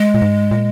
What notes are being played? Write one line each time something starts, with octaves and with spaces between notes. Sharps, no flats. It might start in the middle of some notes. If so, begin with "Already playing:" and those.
Already playing: G#3
A#2
G#2
A#2